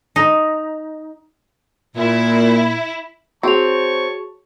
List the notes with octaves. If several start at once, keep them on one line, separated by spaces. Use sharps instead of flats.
D#4
A#2 E4
C4 F#4 G#4 C#5 A5 C#6 F7